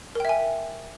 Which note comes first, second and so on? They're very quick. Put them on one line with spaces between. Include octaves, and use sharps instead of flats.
A#4 G5 E5 G#5